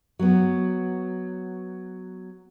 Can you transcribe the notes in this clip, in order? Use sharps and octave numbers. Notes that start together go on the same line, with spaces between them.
F#3 B3